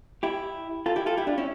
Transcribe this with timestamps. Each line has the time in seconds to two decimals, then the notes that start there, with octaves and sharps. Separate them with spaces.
0.23 E4 G4
0.86 F4 A4
0.96 E4 G4
1.06 F4 A4
1.17 E4 G4
1.27 D4 F4
1.38 C#4 E4